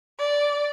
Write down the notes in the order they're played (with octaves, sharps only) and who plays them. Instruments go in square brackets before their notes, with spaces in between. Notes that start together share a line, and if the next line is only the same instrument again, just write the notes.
[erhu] D5